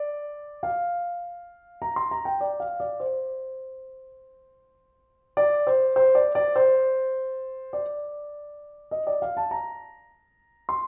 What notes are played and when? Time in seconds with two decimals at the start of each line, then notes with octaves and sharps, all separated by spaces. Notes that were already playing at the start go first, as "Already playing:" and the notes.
Already playing: D5
0.63 F5
1.82 A#5
1.96 C6
2.11 A#5
2.25 G5
2.41 D5
2.60 F5
2.80 D5
3.00 C5
5.37 D5
5.67 C5
5.96 C5
6.15 D5
6.35 D5
6.56 C5
7.73 D5
8.91 D#5
9.07 D5
9.22 F5
9.37 A5
9.51 A#5
10.69 C6